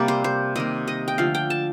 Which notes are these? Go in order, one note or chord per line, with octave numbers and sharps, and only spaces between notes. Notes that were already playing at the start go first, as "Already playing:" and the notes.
Already playing: C3 G3 A#3 D5
C5
C5
C3 D#3 A#3 D#5
D#5
G5
D3 F3 A3 F5
G5
A5